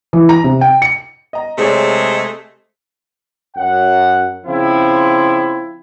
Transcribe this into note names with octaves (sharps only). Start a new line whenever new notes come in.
E3
A#5
C3
G5
C#7
D#5 A#5
C3 G#3 A3 G#4 C#5 D5
F#2 F#5
C#3 F3 C4 E4